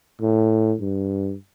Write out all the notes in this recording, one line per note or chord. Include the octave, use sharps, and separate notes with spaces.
A2
G2